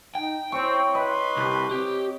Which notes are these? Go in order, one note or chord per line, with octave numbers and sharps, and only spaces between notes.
D#4 G5
C4 E4 C#5 C#6
B4 D#5 B5 C6
C2 G4
C4 G4